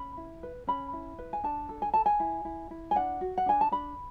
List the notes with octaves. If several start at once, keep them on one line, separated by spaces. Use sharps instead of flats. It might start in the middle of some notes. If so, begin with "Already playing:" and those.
Already playing: C#4 B5
E4
B4
C#4 B5
E4
B4
G#5
D4 A5
A4
G#5
A4 A5
G#5
E4
E4
E4
G#5
D4 F#5
F#4
F#5
D4 G#5
A5
D4 B5